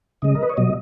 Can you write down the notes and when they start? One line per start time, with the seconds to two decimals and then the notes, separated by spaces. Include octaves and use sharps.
0.22 C#3 G#3 D#5
0.35 A#4
0.43 B4
0.49 C#5
0.57 B2 F#3 D#5